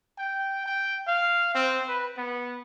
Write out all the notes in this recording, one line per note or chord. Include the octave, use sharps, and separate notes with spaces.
G5
G5
F5
C4
B4
B3